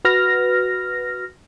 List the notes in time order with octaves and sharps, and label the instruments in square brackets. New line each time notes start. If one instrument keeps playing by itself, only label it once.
[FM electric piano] F#4 B4 F6 A#6